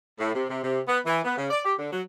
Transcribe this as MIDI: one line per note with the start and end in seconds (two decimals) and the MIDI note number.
0.20 0.34 45
0.34 0.45 48
0.49 0.60 48
0.64 0.80 48
0.88 0.99 59
1.06 1.20 52
1.24 1.35 59
1.37 1.49 49
1.51 1.61 74
1.65 1.74 67
1.79 1.88 50
1.92 2.01 54